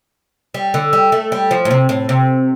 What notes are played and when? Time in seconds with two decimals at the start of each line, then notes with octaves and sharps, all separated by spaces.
0.54 G3
0.74 D3
0.93 G3
1.12 A3
1.32 G3
1.51 F3
1.65 A2
1.71 C3
1.89 A2
2.09 C3